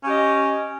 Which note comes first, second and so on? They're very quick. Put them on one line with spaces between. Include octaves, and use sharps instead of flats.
C#4 G4 D#5